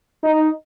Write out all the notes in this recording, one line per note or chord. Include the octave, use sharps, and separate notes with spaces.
D#4